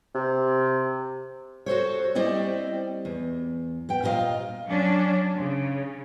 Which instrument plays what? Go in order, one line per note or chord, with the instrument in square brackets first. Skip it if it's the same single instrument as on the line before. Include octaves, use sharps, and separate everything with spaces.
[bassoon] C3
[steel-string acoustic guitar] F#4 A4 C5 C#5
G3 C4 E4 D5 D#5
E2
B3 G5
A#2 F4 B4 D#5 F5
[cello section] F#3 C#4 D4
C#3